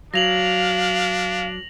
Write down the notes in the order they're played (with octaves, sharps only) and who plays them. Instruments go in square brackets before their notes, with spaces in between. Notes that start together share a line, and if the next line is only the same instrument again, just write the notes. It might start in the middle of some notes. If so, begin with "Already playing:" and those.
[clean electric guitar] F#3 [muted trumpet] D4 [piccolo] F5 [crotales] A#6 F7 F#7